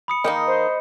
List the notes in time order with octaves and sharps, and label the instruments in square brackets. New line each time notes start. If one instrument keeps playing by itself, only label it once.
[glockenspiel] B5 D#6 C#7
[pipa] D#3 A#3 D#4 [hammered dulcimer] D#5
[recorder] C5